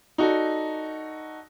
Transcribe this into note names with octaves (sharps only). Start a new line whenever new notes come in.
D#4 F#4 A4 D5